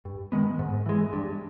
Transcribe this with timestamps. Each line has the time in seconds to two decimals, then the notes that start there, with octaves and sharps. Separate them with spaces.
0.05 G2
0.32 D#3 G#3 B3
0.59 G#2
0.86 E3 G#3
1.13 G2